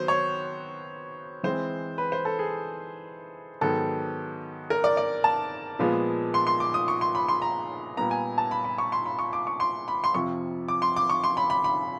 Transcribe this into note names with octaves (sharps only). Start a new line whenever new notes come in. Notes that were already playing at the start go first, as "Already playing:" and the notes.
Already playing: D#3 F#3 B3 C5
C#5
E3 G#3 C4 C5
B4
C5
A4
G#4
G#2 D#3 F#3 B3 A4
A#4
D5
D5
A5
A#2 F3 G#3 B3
C6
C6
D6
D#6
C#6
C6
B5
C6
A#5
A#2 G3 B3 A#5
G#5
A5
B5
B5
C#6
C6
B5
C#6
D6
C#6
C6
B5
C6
F2 C3 F3 C#6
D6
C6
D6
C#6
C6
B5
B5
B5